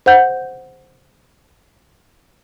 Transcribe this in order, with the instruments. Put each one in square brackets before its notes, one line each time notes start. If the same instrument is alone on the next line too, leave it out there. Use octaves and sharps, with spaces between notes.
[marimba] C5 F#5 G6